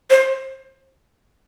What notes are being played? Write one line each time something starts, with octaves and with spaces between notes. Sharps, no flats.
C5